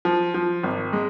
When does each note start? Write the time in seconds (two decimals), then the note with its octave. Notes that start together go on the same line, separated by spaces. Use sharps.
0.05 F3
0.34 F3
0.63 G#1
0.93 G#3